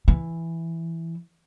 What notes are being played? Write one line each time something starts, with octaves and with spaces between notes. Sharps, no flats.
E3